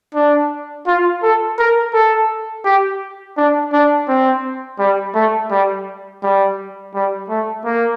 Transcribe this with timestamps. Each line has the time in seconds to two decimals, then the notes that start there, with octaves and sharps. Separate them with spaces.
0.15 D4
0.87 F4
1.23 A4
1.59 A#4
1.94 A4
2.65 G4
3.37 D4
3.73 D4
4.08 C4
4.79 G3
5.15 A3
5.51 G3
6.23 G3
6.95 G3
7.29 A3
7.65 A#3